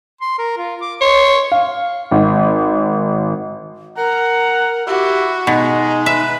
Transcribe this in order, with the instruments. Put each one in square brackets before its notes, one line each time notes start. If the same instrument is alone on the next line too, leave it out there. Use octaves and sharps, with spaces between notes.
[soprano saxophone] C6
A#4
F4
D6
[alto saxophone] C#5 [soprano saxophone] C6
[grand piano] F5
G#1
[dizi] A#4 [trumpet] F#5 [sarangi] A#5
[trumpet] E4 [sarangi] F#4 [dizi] G4
[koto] B2 [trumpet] G#3 [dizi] D#4
[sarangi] B4 [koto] E5